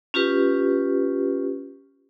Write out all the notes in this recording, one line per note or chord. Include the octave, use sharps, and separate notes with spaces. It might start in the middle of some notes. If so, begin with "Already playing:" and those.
C#4 F4 G4 B4